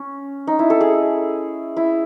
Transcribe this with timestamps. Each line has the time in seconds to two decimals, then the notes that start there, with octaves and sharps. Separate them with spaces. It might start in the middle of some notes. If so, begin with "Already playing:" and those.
Already playing: C#4
0.47 D#4
0.59 E4
0.70 A4
0.81 G#4
1.77 E4